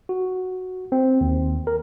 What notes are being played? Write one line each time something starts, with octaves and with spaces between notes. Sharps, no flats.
F#4
C4
D#2
A#4